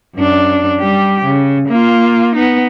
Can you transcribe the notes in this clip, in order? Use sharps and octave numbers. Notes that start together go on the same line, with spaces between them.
F#2 D4
G3 G4
C#3
A#3 F4
B3 D#4